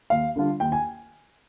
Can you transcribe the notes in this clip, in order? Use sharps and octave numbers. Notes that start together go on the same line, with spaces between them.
D#2 F5
D3 G3 D4 F4
D#2 G5
G#5